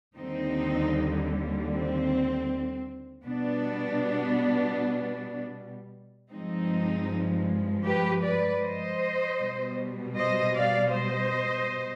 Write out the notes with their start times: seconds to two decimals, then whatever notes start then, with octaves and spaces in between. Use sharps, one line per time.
0.16 D#2 D3 G3 C4 D#4
1.70 C4
3.24 B2 G3 B3 D4
6.31 G2 F3 G#3 C4 D#4
7.85 G4 B4
8.23 B4 D5
8.62 C5 D#5
9.40 B2 G3
10.15 C5 D#5
10.55 D5 F5
10.92 C5 D#5